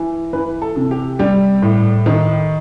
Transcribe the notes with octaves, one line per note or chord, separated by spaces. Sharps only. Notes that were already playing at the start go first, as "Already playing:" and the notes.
Already playing: E3
E3 B4
A4
C3
G4
G3 G4
A2
D#3